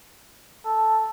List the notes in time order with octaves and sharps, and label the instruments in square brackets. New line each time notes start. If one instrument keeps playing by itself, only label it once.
[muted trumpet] A4